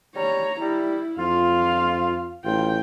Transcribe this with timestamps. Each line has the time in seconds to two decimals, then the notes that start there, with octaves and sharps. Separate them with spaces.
0.16 G3 C#5 A#5
0.61 G3 E4
1.19 F2 F4 F5
2.45 A1 F4 G5